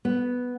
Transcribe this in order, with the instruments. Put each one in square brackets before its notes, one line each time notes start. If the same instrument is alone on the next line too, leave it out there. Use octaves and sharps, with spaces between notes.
[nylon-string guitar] B3